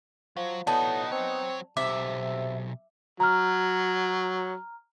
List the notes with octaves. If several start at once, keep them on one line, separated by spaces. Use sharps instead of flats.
F3 F#3 F5
B1 A2 B3 D#4 F#4 D5 G#5 A5
F#3 C4 C#5
B1 C3 E5 D6
F#3 A#5 F6